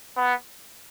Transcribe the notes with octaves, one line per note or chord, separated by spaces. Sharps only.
B3